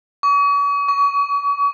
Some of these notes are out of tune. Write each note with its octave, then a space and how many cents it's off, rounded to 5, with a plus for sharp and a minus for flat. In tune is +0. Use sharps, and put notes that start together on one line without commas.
C#6 +45
C#6 +35